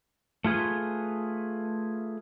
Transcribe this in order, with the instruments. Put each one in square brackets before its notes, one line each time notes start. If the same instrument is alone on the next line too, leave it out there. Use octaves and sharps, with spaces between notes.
[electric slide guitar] A3 F4 G#4 B4